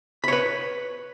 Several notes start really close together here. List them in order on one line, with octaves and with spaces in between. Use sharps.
B5 C#5 B4